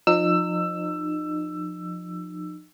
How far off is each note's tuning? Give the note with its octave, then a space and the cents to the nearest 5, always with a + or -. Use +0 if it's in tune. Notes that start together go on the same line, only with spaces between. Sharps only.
F3 +15 D#4 -30 E6 +15